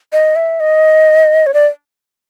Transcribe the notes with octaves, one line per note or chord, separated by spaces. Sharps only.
D#5
E5
D#5
C#5
D5